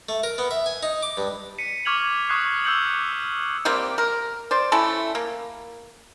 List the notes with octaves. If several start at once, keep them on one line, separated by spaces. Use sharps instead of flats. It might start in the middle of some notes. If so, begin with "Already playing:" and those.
A3
A#4
B3
E5
G#5
D#4
D6
G2
B6 C#7 D#7
C#6 D6 F6 G#6 F7 F#7
C#6 D#6 F#6 G#6 C7
D6 E6 F6 G6 C#7 F#7
E6
G3 A#3 C4 G4
A#4
C5 D5
A3 C#4 E4 A4
A#3